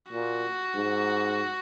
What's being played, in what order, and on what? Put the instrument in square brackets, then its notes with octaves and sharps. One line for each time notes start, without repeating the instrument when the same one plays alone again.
[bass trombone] A#2 [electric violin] F#4
[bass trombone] G#2